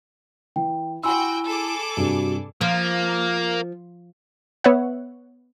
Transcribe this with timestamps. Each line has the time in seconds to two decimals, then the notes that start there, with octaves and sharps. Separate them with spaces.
0.56 E3 G5
1.03 E4 F#4 G5 G#5 B5 C6 E6
1.48 G#4 A4 D6
1.97 G2 C3 F#4
2.61 F3 A#3
4.64 B3 C#5 E5 F#5